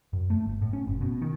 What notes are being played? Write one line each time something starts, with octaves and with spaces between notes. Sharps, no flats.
F#2
A3
G1
A2
C#4
F#1
B2
D#3